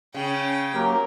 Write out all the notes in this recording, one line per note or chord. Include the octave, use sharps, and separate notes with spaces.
C#3 C#4 G5
F#3 A#3 G4 A#4